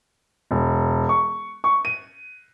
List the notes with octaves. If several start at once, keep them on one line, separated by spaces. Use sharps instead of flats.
E1
C#6
C#6
D#7